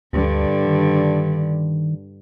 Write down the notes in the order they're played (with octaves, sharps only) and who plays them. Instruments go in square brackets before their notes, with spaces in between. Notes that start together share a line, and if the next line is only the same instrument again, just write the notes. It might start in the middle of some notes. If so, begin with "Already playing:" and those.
[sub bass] D2 [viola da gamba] G2 D3
[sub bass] D#3